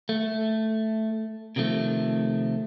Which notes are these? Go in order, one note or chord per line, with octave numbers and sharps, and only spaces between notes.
A3
C3 D#3 F3 A3